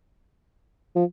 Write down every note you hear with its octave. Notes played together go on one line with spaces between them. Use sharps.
F3